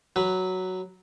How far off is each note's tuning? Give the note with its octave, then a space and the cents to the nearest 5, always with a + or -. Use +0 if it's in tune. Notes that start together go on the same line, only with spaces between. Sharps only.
F#3 +5 B4 +0